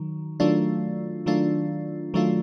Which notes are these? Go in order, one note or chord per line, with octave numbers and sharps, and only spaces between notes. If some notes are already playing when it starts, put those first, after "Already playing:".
Already playing: D#3 F#3
D#3 F#3 A3 D4 F4
D#3 F#3 A3 D4 F4
D#3 F#3 A3 D4 F4